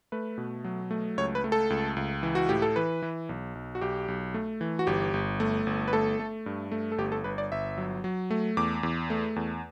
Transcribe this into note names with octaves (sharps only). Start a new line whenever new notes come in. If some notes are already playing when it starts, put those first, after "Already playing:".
A3 B4
B2
F#3
A3
C#2 C#5
B4
A3
A4
C#2
C#2
E3
F#4
A2 G4
A4
E3 B4
E3
B1
B1
F#4
B1 G4
B1
A3
E3
F#4
G1 G4
G1
A3
G1
B4
A3 A4
A3
G2
A3
A4
G1 G4
A4
G1 B4
D5
G1 E5
F#3
F#3
A3
E2 D6
E2
A3
E2